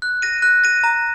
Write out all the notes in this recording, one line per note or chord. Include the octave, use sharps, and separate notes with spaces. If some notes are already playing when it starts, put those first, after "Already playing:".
F#6
A#6 D#7
F#6
A#6 D#7
A#5